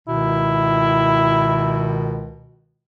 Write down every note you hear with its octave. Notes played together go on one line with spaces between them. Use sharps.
C#2 B2 D#3 E4